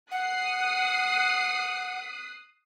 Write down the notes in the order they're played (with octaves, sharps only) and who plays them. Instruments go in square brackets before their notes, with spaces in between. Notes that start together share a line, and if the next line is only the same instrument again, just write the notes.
[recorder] F#5 [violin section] D#6 F#6 C7